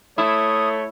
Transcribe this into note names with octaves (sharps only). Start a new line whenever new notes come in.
A3 E4 C#5 D#6